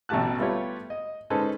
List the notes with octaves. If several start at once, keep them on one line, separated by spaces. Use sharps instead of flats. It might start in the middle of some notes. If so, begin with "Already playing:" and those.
A1 B2 A3 G4 A5 F#6
G3 A3 B3 F4 G4 C#5
D#5
G#3 C#4 D#4 A4 B4 C5